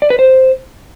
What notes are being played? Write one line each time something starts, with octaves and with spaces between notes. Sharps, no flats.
D5
B4
C5